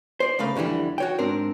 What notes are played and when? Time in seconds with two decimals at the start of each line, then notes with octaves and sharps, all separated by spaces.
0.20 C5 D5
0.39 C2 C#3 A3 A#3 F5 B5
0.56 F2 A2 D3 E3 G3
0.98 F#4 C#5 G5
1.19 G#2 C4 D4 A#4